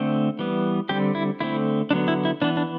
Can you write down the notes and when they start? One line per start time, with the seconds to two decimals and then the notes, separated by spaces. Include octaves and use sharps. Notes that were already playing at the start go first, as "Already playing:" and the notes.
Already playing: D3 A3 C4
0.39 E3 G3 B3
0.89 D3 G3 C4 G4
1.15 E4
1.40 D3 A3 C4 E4
1.91 D3 F#3 B3 D4
2.08 E4
2.25 E4
2.42 E3 B3 D4
2.57 D4